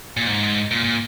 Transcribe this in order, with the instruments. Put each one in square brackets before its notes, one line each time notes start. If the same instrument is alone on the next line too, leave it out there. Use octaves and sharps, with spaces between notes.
[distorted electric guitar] A#2
G#2
A#2
A#2